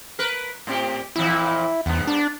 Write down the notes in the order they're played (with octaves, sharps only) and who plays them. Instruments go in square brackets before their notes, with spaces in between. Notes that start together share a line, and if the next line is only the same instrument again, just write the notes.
[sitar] A#4 B4
A2 C4 G4
[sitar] F2 A#2 E3 [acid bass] E4
[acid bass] E2 [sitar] G2 B3
[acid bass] D4